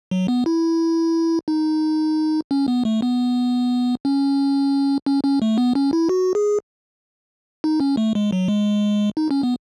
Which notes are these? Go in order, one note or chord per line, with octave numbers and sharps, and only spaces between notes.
F#3
B3
E4
D#4
C#4
B3
A3
B3
C#4
C#4
C#4
A3
B3
C#4
E4
F#4
G#4
D#4
C#4
A3
G#3
F#3
G#3
D#4
C#4
B3